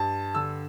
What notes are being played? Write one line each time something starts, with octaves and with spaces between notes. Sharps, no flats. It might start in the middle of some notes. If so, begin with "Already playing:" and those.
Already playing: G2 A5
D3 E6